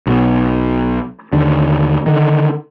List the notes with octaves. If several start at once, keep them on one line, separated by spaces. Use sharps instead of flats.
B1 B2
D#2 D3
D3 D#3